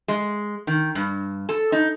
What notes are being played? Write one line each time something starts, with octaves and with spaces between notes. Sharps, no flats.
G#3
D#3
G2
A4
D#4